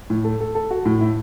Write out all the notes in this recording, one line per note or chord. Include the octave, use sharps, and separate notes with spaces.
A2
A4
A4
A4
F#4
A2
E4